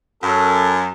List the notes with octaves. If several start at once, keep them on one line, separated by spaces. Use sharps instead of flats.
F#2 A4